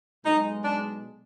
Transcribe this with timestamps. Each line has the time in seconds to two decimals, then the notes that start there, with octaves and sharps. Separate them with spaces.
0.24 B1 B2 G#3 D#4
0.62 D4